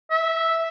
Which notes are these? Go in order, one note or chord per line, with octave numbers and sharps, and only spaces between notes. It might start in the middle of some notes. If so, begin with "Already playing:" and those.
E5